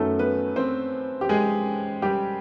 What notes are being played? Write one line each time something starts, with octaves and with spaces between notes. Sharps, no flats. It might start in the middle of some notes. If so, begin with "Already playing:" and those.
Already playing: F#2 D#3 F#3 A3 B3 A4
B3 B4
C4 C5
G4
G#3 G#4
G3 G4